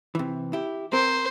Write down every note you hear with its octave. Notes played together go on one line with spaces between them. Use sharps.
C3 E3
E4 G4
C4 A#4 C5